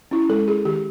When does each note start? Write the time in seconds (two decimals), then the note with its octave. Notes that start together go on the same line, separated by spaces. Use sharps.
0.11 C#4 E4
0.29 G#3 A4
0.47 C#4 E4 G#4
0.65 D#3 G4